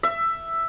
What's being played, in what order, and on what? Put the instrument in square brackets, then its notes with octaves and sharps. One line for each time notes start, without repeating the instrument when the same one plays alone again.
[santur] E5